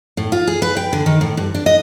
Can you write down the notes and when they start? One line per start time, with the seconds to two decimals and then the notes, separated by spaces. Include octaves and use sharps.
0.17 A2
0.32 F4
0.47 G#4
0.62 B4
0.77 G5
0.93 D3
1.06 D#3
1.21 A2
1.37 G2
1.55 D4
1.66 D#5